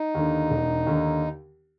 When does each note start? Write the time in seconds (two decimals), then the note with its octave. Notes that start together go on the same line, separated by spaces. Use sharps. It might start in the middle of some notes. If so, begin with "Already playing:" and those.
Already playing: D#4
0.15 D#2 D3
0.50 E1
0.87 D#2 D3